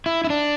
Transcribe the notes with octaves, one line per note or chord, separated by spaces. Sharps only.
E4
E4
D4